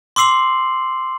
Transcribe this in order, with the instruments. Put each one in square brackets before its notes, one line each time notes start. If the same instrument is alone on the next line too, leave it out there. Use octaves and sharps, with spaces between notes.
[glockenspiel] C6 D6 E6 C7 F#7